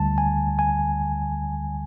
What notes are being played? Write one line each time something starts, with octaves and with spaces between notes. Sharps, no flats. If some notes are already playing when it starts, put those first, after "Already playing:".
Already playing: D2 D3 G3 A5
G#5
G#5